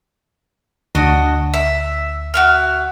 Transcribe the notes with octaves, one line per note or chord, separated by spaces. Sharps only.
D2 D4 F#4 D#5
E5
F#4 E5 F6